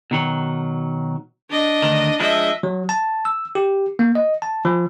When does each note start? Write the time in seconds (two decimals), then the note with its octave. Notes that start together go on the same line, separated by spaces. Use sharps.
0.11 B2 D#3 F#3
1.50 D4 D#5
1.82 D2 D#3
2.20 F3 G#3 D4 D#5 E5
2.63 F#3
2.89 A5
3.25 E6
3.55 G4
3.99 A#3
4.15 D#5
4.42 A5
4.65 F3